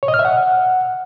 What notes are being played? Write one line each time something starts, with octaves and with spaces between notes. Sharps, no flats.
C#5
D#5
F6
E5
F#5